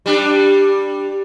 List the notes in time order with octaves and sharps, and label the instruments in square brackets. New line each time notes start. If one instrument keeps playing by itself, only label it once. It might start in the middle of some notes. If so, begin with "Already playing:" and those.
[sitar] G3 D4